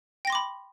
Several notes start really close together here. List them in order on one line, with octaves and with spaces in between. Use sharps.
G5 A#6 C6 D6 B5